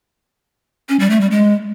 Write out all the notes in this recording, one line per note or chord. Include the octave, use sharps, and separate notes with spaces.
C#4
G3
A3
G3
G#3